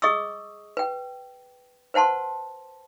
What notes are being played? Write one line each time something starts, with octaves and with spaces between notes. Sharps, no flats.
G#4 D#5 C#6 D#6 E6
B4 G5
B4 C5 F#5 A5 C6